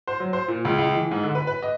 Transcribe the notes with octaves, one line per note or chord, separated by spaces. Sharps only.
C5
F#3
C5
A#2
C#2
C#2
E3
G#2
D3
B4
B4
D#5